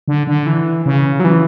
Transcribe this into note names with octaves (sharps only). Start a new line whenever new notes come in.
D3
D3
E3
C#3
F#3
E3